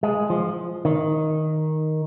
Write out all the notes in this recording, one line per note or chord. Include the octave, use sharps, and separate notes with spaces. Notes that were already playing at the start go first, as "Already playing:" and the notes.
G#3
F3
D#3